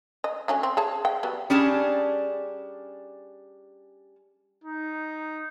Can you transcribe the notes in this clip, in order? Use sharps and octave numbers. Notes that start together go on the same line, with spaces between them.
D#5
D3 F#3 C#4
C4
G#4 C#5 A5
G5
F#3 G3 B3
G3 C#4 D4 G#4 G#5 A5
D#4